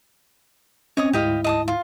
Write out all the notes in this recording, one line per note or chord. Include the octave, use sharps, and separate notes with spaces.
C4 C#4 C#5 D#5 D#6
D2 G#2 E4 G4 D#5 F5
D#5 A5 D#6
F4